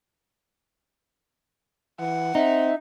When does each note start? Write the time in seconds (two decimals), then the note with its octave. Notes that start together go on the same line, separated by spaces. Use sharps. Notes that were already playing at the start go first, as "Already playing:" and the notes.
2.00 E3 F#5
2.35 C4 D#4 E5